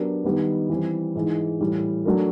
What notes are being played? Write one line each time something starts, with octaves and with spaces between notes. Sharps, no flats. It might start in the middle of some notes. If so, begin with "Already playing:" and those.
Already playing: F#3 B3 D4 G4 A#4
D#3 G3 B3 D#4 G4
E3 G3 C4
G#2 E3 G#3
A2 E3 G3
F#3 A3 D4 F#4 A#4